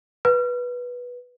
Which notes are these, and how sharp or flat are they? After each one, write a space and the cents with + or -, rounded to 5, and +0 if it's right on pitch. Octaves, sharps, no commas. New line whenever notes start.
B4 -10